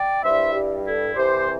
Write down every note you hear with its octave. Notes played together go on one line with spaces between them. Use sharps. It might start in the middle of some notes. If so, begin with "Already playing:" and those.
Already playing: D5 G5
G2 G3 E4 C5 E5
G4
E4 A4
C2 C3 E3 G4 C5